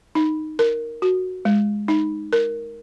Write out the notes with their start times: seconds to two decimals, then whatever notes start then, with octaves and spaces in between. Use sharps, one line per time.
0.15 D#4
0.59 A#4
1.02 F#4
1.45 G#3
1.88 D#4
2.33 A#4